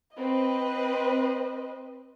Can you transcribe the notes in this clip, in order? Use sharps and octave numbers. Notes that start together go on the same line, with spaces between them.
C4 B4 D#5